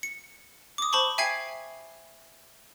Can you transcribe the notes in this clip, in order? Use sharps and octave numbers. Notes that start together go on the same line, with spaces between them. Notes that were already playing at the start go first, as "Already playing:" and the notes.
C#7
D6 D#6
C5 A5 B5 C#6
E5 G5 G#5 G#6 C7